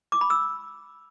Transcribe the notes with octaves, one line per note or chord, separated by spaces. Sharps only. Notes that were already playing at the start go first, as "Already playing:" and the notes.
D6
B5
E6